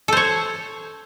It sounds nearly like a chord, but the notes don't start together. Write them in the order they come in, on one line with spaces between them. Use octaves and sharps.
A4 C5 C#5